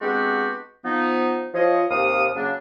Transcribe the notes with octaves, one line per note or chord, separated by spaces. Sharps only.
G#3 B3 C4 D4 F#4 G4
F3 B3 D#4
F3 C#5 D#5
D#2 C3 F5 D#6
C#3 F#3 A#3 C#4 D4